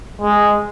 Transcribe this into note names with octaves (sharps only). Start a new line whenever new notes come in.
G#3